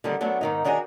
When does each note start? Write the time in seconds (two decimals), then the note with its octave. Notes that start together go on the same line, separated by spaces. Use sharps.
0.04 D3 D#3 G3 B3
0.21 F#3 A3 B3 D4
0.41 G#2 D#3 D#4
0.65 D#3 D4 D#4 F#4 G#4